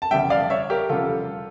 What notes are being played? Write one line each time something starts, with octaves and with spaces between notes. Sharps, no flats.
A5
F1 E2 C#3 G3 E5 G5
D5 F5
C#5 E5
G4 A#4
F1 E2 C#3 G3 F4 A4